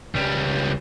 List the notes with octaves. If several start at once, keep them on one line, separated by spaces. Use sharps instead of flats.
C#2 G3